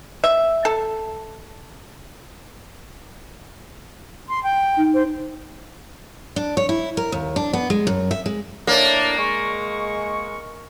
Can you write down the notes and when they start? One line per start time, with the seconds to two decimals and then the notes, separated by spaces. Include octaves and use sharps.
0.24 E5
0.65 A4
4.29 C6
4.44 G5
4.77 D#4
4.94 C5
6.36 D4
6.57 C#5
6.69 E4
6.97 A#4
7.12 D#2
7.36 D4
7.53 B3
7.70 G#3
7.87 F#2
8.11 E5
8.26 G#3
8.67 A2 A#3 D4 D5
9.17 G#3 C#6